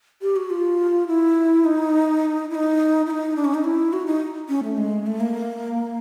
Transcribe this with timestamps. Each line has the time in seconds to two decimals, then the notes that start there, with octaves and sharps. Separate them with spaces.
0.21 G4
0.36 F#4
0.50 F4
1.07 E4
1.65 D#4
2.50 E4
2.55 D#4
3.06 E4
3.10 D#4
3.36 D4
3.45 C#4
3.54 D#4
3.64 E4
3.93 F#4
4.06 D#4
4.49 C#4
4.63 A3
4.77 G#3
5.06 A3
5.20 A#3